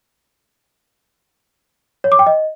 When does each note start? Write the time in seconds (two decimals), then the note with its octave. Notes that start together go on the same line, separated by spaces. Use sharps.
2.04 C#5
2.12 D6
2.19 G5
2.27 D#5